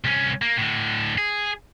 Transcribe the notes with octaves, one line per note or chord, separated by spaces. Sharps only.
C2 C#4
A#3
A2 D3
G#4